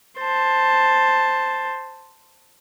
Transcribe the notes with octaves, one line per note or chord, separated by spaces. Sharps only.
C5 A5